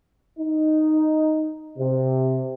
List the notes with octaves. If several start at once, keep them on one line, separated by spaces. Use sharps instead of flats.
D#4
C3